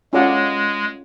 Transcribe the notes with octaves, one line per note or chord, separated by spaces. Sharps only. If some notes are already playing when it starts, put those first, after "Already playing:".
G#3 C#4 F4 A4 D5 F#5